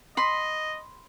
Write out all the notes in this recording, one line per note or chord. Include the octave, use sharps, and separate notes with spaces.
D#5 B5 C6